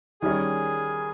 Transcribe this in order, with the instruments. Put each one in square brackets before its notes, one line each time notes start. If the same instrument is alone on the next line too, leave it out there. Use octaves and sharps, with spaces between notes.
[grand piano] D#3 G3 C#4 [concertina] G#4